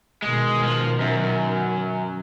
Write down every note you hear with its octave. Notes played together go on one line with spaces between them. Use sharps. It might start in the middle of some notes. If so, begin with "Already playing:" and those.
B2 D#3 G#3
F3
F#2